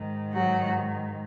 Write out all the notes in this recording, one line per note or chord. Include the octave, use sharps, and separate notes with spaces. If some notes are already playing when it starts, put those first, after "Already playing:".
Already playing: G#2 D#3
F#3 F#4